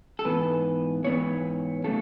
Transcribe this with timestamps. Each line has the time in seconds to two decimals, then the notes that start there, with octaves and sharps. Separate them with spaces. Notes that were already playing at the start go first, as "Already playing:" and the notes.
0.19 A4
0.25 G#2 E3 B3 B4
1.04 G#2 E3 B3 C#5
1.84 C#3 F#3 A3 A4